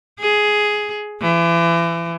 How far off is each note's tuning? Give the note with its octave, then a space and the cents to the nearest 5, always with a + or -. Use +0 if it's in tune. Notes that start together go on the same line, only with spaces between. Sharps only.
G#4 +10
E3 +35